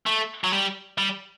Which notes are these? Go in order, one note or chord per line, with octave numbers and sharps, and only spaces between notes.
A3
F#3
G3
G3